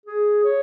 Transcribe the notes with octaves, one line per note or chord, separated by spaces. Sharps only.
G#4
C#5